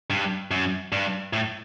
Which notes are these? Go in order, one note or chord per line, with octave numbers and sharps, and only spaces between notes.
G2
F#2
G2
A2